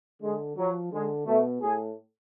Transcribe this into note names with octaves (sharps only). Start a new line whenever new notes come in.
D3 G#3
F3 F#3
D3 G#3
B2 A3
A2 G#4